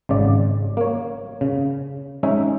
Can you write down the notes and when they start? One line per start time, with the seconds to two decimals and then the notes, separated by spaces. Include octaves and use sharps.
0.09 G#1 C#3 D5
0.77 A#3 C#5
1.41 C#3
2.23 G#3 C#4 D#4 G#4 E5